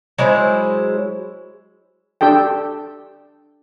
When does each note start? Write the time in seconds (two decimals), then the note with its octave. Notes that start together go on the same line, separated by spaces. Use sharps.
0.18 F#3 G#3 E4 C5
2.21 D4 G4 A4 G5